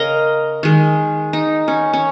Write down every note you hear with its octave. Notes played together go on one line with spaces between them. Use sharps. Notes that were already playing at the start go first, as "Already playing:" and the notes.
Already playing: C#3 A#4 C#5 D#5 F5
D#3 G#3
D#4
C#4
C#4